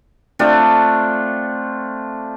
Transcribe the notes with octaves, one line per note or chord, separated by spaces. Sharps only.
A3 C4 D4 F4